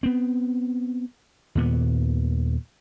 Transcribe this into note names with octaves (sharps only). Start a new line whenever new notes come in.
B3 C4
D#2 A#2 B3